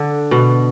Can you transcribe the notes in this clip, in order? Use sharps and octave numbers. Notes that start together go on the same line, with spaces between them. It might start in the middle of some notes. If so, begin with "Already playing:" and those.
Already playing: D3
B2